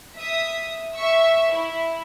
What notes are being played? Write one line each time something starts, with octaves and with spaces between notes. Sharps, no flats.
E5 D#6
E5 C#6 E6
E4